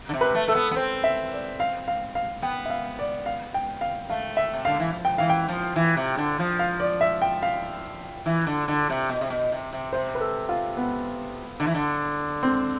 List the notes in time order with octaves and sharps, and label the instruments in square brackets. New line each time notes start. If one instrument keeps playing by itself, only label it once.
[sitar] D3
C3
[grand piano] B4
[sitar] A3
[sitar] A3 [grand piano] A4
[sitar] B3
B3
[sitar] C4 [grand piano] C5
[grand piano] E5
D5
F5
F5
F5
[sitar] B3 [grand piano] G5
[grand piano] E5
F5
D5
F5
G5
F5
[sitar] A3 [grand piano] F5
[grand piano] E5
[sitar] C3
[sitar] D3 [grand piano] F5
[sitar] E3
F3
[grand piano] G5
[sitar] E3 [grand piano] F5
[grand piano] G5
[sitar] F3
E3
C3
D3
F3
[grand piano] F5
D5
E5
G5
F5
[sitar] E3
D3
D3
C3
B2
C3
B2
C3
C3
[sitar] C3 [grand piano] C5
[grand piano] B4
A4
F4
B3
[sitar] D3
E3
D3
[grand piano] C4